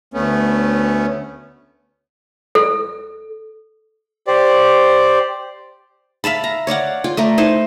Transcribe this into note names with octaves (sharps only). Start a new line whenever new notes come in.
D2 A3 B3 C#4
A4
G4 C5 D5
E5 F5 A5 B5
A#5
C#5 D5 F5 F#5
F4 G5
A3 D5 A#5
D#4 E4 C5